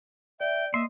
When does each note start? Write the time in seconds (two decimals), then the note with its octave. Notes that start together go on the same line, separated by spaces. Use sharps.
0.40 D5 E5 G5
0.74 A#3 D#5 E5 C6